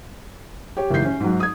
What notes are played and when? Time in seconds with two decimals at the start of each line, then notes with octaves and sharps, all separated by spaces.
0.77 G4 C#5
0.90 F#1 G#2 D#3 E3 G6 C7
1.04 C#4
1.20 G#2 F#3
1.40 D#6 G#6